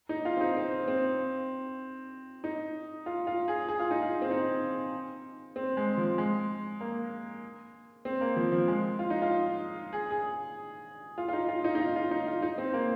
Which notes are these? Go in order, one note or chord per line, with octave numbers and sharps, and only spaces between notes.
D#4
F4
C4
D#4
C4
C4
D#4
F4
F4
G#4
G#4
F4
D#4
F4
C4
D#4
C4
G#3
F3
G#3
A#3
C4
A#3
F3
F3
G#3
F4
D#4
F4
G#4
G#4
F4
F4
D#4
F4
D#4
D#4
F4
F4
D#4
F4
D#4
C4
A#3